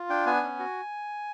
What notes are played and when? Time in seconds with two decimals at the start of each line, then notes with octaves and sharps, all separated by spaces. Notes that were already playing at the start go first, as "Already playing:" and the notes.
Already playing: F4
0.09 D4 G5
0.26 B3 G#5
0.43 C#4
0.59 F#4